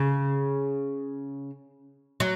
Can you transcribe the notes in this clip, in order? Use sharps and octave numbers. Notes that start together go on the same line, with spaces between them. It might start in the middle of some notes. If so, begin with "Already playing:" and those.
Already playing: C#3
F#3